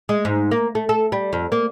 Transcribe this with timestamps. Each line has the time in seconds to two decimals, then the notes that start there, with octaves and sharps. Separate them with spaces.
0.09 G#3
0.25 G#2
0.51 A#3
0.75 A3
0.89 A4
1.12 G3
1.33 F2
1.52 A#3